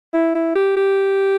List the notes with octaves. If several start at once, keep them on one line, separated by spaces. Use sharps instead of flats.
E4
E4
G4
G4